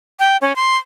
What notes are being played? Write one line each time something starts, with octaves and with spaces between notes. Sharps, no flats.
G5
C#4
C6